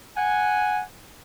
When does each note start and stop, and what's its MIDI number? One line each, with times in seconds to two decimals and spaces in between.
0.17 0.81 78
0.17 0.81 80